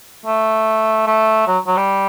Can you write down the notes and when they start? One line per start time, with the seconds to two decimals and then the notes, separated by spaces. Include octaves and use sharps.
0.26 A3
1.07 A3
1.47 F#3
1.67 F#3
1.77 G3